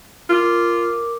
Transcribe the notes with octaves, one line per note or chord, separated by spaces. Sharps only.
F4 A#4 D6